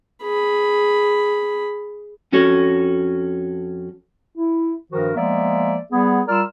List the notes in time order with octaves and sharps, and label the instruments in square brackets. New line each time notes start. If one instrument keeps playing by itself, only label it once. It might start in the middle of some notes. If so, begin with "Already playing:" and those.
[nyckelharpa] G#4 B5
[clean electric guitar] F2 C#4 F#4 A4 C#5
[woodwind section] E4
G2 D#3 F3 F#4 A#4
F3 G#3 A#3 B3 D5 E5
G3 B3 G#4
G3 F4 A#4 D5 E6 F6